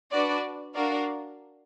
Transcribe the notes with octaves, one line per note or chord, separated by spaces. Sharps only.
D4 F#4 B4 D5
D4 F#4 A#4 D5 F5